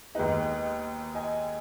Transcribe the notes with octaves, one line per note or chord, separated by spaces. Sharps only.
D#2 D#3 G#3 B3 D#4 B4 D#5
D#5 G#5